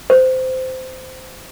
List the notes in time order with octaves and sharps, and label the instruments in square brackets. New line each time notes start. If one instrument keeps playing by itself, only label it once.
[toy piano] C5